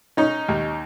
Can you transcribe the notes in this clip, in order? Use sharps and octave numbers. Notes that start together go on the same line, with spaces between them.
C#4 D#4
D#2